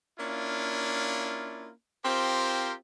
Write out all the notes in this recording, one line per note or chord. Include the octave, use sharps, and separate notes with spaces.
A#3 C#4 D4 E4 F4
C4 F4 G4 A#4 C5